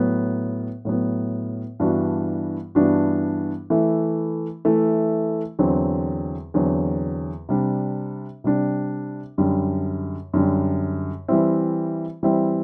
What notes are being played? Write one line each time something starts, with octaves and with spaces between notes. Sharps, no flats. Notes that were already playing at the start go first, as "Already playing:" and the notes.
Already playing: A2 F#3 B3
A2 F#3 B3
G2 E3 B3 D4 F#4
G2 E3 B3 D4 F#4
E3 A3 E4
E3 A3 E4
E2 D3 F#3 C4
E2 D3 F#3 C4
C3 G3 D4
C3 G3 D4
F#2 D3 G3
F#2 D3 G3
E3 G3 C4 E4
E3 G3 C4 E4